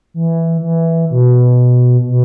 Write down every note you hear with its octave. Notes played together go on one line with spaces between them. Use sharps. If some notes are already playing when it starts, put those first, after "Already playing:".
E3
E3
B2
B2